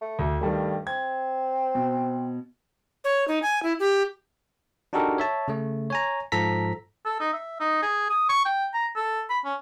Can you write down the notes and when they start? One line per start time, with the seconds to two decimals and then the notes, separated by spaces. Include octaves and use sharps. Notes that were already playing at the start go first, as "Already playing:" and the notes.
0.01 A3
0.19 D2
0.41 G2 D#3 G3 A3
0.87 C4 G#6
1.75 B2
3.04 C#5
3.28 D#4
3.43 G#5
3.63 E4
3.80 G4
4.93 D4 D#4 F#4 G4 A4 A#4
5.18 C#5 E5 A5
5.48 C#3 A3
5.90 C#5 G#5 A#5
6.32 G#2 F3 A4 A#5 B6
7.05 A4
7.20 D#4
7.33 E5
7.60 D#4
7.83 G#4
8.10 D#6
8.29 C#6
8.45 G5
8.74 A#5
8.96 A4
9.30 B5
9.45 C#4